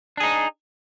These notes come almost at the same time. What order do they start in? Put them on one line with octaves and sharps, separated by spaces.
D4 G#4 D#4